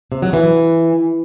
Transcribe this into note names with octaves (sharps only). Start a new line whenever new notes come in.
C3
F#3
E3